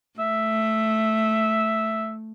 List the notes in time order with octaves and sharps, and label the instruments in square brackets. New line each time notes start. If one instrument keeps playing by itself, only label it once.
[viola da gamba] A3 [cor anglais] E5